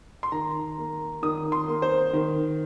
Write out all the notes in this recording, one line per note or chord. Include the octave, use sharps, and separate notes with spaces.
C6
D#3 A#5
A#3
D#3 D#6
C6
A#3
C5
D#3